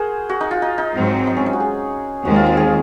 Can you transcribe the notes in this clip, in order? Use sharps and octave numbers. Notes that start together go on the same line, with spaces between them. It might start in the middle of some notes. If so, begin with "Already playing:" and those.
Already playing: F#4 G#4 A#4 C5
F#4
D#4
F4
D#4
D#4
G#2 F#3 C4
D#4
C#4
D#4
F#4
G#4
D#2 D#3 G#3 C4 F#4
F4
F4
G#4